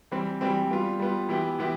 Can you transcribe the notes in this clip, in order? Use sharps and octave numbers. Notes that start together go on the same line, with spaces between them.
E3 G3 C4
E3 G3 C4
G3 B3 F4
G3 B3 F4
E3 B3 E4 G4
E3 B3 E4 G4